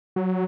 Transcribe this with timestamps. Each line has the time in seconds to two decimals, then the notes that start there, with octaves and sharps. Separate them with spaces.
0.16 F#3